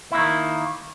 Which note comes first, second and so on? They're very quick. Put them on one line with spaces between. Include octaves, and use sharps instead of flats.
E4 A#3 D#3